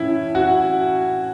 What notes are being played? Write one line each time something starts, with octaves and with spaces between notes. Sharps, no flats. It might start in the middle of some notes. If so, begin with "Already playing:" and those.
Already playing: A2 E3 C#4 E4
F#4